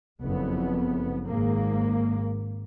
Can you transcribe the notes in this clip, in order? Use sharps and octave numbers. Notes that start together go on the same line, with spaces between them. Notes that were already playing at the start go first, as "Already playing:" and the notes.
F#1 F2 B3
G#1 G#2 A#3